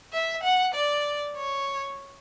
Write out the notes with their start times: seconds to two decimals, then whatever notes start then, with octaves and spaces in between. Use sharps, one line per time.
0.13 E5
0.43 F#5
0.74 D5
1.37 C#5